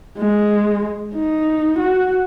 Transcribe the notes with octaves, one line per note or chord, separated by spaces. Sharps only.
G#3
D#4
F#4